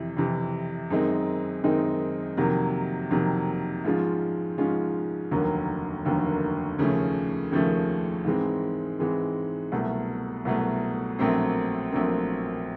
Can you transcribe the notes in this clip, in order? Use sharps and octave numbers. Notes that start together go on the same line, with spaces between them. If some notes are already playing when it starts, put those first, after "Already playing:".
Already playing: F2 C3 E3
F2 C3 E3
F#2 D#3 G#3 C4 D#4
F#2 D#3 G#3 C4 D#4
F2 C3 D#3 F#3 A#3
F2 C3 D#3 F#3 A#3
G#2 F3 G#3 C#4 F4
G#2 F3 G#3 C#4 F4
F1 D#2 D3 F#3 A#3
F1 D#2 D3 F#3 A#3
D#2 C#3 F3 A3 C#4
D#2 C#3 F3 A3 C#4
G#2 E3 G#3 C4
G#2 E3 G#3 C4
C2 B2 F#3 A3
C2 B2 F#3 A3
A#1 A#2 F#3 A3 C4
A#1 A#2 F#3 A3 C4